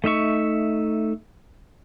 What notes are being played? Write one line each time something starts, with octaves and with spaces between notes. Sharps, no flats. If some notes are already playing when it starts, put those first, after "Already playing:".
A3 D#4 E5 C#6